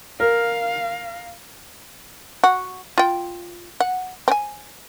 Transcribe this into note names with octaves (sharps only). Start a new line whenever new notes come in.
A#4 F5
F#4
F4 G5
F#5
C4 G#5